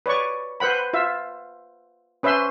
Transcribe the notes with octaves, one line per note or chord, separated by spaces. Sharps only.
B4 C#5 D5 C#6
B4 C5 F#5 B5
F4 E5
C#4 B4 C5 E5 C6